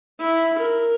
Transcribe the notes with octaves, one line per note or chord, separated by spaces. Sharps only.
E4
A#4